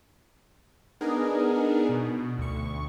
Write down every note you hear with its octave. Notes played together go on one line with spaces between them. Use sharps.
B3 D4 D#4 G#4 A#4
B2
D2 C#6